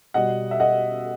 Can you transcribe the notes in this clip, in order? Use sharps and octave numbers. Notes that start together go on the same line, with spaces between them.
B2 G3 D#5 F#5
E5
D#5 F#5